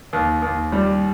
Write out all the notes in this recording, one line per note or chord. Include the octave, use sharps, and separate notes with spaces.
D#2
D#2
G3